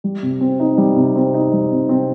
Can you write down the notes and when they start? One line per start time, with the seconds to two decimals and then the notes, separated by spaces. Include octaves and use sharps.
0.04 G3
0.23 C3
0.41 C4
0.60 D#4
0.78 G3
0.96 C3
1.16 C4
1.34 D#4
1.53 G3
1.71 C3
1.89 C4